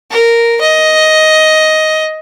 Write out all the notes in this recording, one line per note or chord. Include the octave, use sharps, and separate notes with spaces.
A#4
D#5